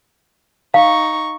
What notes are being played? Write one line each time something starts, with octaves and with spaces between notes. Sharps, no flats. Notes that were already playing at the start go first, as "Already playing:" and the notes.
D#4 F5 C#6